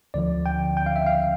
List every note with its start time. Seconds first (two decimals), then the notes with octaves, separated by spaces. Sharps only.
0.14 D2 D3 F3 D5
0.46 G5
0.77 G5
0.86 F5
0.96 E5
1.06 F5